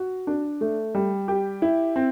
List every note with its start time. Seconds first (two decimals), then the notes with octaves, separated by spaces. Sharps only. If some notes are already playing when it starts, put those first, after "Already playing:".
Already playing: F#4
0.27 D4
0.61 A3
0.95 G3
1.28 G4
1.62 E4
1.96 C4